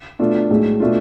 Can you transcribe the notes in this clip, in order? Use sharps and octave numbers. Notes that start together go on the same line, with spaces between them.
B2 A3 D4 F4 A4
B1 A2 G#3
B2 A3 D4 F4